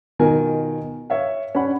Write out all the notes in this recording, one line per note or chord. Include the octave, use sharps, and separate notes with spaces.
B2 D#3 F4 A#4 G#5
C#5 E5 F5
C#4 D4 F#5 B5